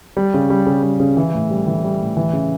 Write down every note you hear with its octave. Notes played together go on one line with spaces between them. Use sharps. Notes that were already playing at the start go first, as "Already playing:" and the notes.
G3
C#3
G3
C#3
G3
C#3
E3
A2
G3
E3
G3
A2
E3
C#3